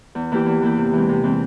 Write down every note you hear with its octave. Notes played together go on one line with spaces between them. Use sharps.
E2
E3 A#3 E4 G4
E2
E3 A#3 E4 G4
C3
E3 G#3 C4
C3
E3 G#3 C4